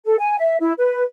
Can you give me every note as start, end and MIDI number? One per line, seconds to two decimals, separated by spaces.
0.06 0.15 69
0.19 0.36 80
0.39 0.57 76
0.60 0.72 64
0.78 1.02 71